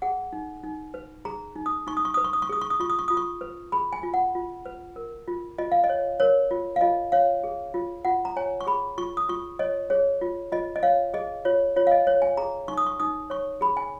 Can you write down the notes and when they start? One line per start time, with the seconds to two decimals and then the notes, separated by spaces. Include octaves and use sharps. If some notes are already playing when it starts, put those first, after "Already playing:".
0.02 G#4 F#5
0.33 D#4
0.64 D#4
0.94 B4
1.25 G#4 A#5
1.56 D#4
1.66 D#6
1.87 D#4 C#6
1.97 D#6
2.05 C#6
2.14 B4 D#6
2.24 C#6
2.33 D#6
2.42 C#6
2.49 G#4 D#6
2.61 C#6
2.70 D#6
2.80 F4 C#6
2.90 D#6
2.99 C#6
3.08 F4 D#6
3.17 C#6
3.41 B4
3.72 G#4 B5
3.93 G#5
4.03 F4
4.14 F#5
4.35 F4
4.66 B4
4.96 A#4
5.28 F4
5.58 F4 D#5
5.72 F5
5.84 D#5
5.89 C#5
6.20 A#4 C#5
6.51 F4
6.76 F5
6.81 F4 D#5
7.12 C#5 F5
7.44 G#4
7.74 F4
8.05 F4 F#5
8.25 A#5
8.36 C#5 G#5
8.61 C#6
8.67 G#4 B5
8.98 F4 C#6
9.17 D#6
9.29 F4 C#6
9.59 C#5 D#5
9.90 G#4 C#5
10.21 F4
10.52 F4 D#5
10.76 D#5
10.83 C#5 F5
11.14 G#4 D#5
11.45 F4 C#5
11.76 F4 C#5
11.87 F5
11.92 D#5
12.07 C#5
12.22 G#5
12.37 G#4 A#5
12.68 D#4 C#6
12.78 D#6
12.86 C#6
13.00 D#4 D#6
13.30 C#5 C#6
13.61 G#4 B5
13.77 G#5